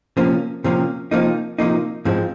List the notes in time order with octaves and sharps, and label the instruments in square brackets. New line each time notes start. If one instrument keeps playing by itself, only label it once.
[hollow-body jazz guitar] C3 F3 A#3 C#4
C3 F3 A#3 C#4
C3 F3 A#3 D#4
C3 F3 A#3 D#4
G#2 F3 G#3 C4